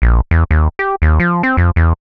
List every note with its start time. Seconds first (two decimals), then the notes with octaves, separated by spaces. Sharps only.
0.02 A#1
0.31 E2
0.51 D#2
0.79 G4
1.02 D#2
1.20 F3
1.43 C4
1.57 F2
1.76 E2